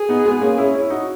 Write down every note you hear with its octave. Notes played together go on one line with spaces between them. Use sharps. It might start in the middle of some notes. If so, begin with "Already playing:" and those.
Already playing: G#4
B3 D#4
G#3 B3
A#3 C#4
C#4 E4
C#4 E4
D#4 F#4